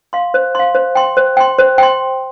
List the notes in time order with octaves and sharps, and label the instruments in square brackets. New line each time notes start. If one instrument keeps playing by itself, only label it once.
[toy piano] F5 C6
C5
F5 C6
C5
G5 C6
C5
G5 C6
C5
G5 C6